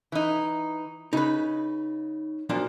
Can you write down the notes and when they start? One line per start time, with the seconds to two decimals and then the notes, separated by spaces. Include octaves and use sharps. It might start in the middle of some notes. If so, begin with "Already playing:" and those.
0.12 E3 D#4
1.13 C#3 D#4 B4
2.49 B1 A#2 F3 D4